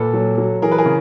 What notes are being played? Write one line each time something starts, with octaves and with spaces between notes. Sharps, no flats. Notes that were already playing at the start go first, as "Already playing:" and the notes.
Already playing: A#2 A4 B4
F#3
F#3
E3 G#4 A#4
B4
G#4 A#4
C#3